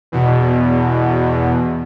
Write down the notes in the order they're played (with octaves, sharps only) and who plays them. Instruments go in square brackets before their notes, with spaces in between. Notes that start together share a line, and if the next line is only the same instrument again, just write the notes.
[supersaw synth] E2 B2